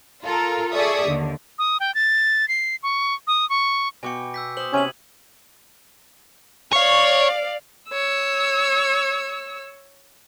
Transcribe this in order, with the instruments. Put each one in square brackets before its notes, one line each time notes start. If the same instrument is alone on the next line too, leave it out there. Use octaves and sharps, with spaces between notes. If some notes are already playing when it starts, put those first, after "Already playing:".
[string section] F4 A4 A#4
G#4 A4 D5 E5 C#6 D#6
D#2 D3
[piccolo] D#6
G5
A6
C7
C#6
D#6
C#6
[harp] B2 F#4 G5 [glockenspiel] G#5 D6 C#7
[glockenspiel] E6 G6 B6
[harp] C5 [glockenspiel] D#6 F#7
[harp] C3 E4 [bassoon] C#4 [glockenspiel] G#6 D#7 F#7
[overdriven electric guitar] C#5 [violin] D5 F5
[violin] C#5 E6